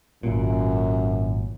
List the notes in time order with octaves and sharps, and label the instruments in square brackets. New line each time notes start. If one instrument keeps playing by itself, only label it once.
[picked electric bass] G#1 A#2 [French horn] F#2